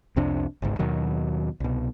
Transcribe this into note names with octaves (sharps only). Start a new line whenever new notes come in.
C2 F2 C3 D4
G1 C#2 G#2
D#2 B2 D#3 F#3
C2 B2